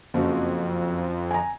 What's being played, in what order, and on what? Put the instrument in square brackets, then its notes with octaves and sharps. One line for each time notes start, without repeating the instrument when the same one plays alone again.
[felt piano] F#1 F#4 [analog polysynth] F2
[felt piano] G#5 A#5